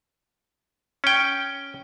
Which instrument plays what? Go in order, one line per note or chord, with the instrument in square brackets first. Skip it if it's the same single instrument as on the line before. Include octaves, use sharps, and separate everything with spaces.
[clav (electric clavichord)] C#4 G5